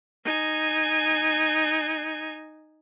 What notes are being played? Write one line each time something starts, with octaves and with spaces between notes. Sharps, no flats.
D#4 G#5